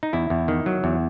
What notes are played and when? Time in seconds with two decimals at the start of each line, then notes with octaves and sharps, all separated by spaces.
0.03 D#4
0.13 E2 E4
0.30 E2
0.48 D#3
0.66 F#3
0.84 E2